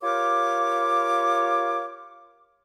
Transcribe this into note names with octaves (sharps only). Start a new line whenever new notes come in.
F4 G4 A#4 C#5 D6